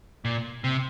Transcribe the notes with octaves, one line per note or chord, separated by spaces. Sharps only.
A#2
C3